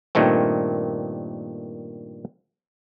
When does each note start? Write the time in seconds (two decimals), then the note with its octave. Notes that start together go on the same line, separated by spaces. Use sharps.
0.15 G2 A#2 D#3 A3 C4